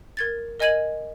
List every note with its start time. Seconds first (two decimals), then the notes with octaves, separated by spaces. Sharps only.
0.17 A#4 G#6 A6
0.60 A#4 D#5 G#5 G#6 D#7 F#7